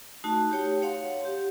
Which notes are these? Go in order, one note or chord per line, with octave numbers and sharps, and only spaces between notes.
A3 D#4 F#4 A5
G4 C#5 G5
C#5 F5 F#5 C6
G4